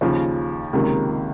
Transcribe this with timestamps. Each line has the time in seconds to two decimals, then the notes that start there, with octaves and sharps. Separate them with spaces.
0.01 D#2 C#3 F3
0.73 C#2 C3 D#3 A#3